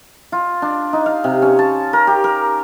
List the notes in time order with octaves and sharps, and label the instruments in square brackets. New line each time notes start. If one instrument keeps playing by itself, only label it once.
[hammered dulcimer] F4
D4
D#4
F5
C3
C#4
A5
A#4
G4
A#4